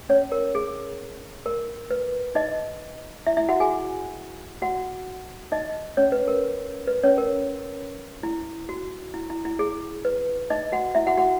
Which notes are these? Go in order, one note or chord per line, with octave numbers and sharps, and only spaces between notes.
C#4 C#5
A#4
G#4
A#4
B4
D#4 D#5
E4 E5
E4 E5
F#4 F#5
G#4 G#5
F#4 F#5
D#4 D#5
C#4 C#5
B4
A#4
B4
C#4 C#5
A#4
E4
F#4
E4
E4
E4
G#4
B4
D#4 D#5
F#4 F#5
E4 E5
F#4 F#5
F#4 F#5